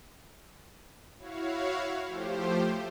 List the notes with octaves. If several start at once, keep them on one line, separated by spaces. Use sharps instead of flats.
E4 F#4 C#5 F5
F3 A3 G4 C5